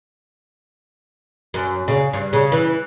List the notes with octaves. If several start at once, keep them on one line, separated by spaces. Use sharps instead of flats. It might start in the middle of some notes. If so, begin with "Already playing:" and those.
F#2
C#3
G2
C#3
E3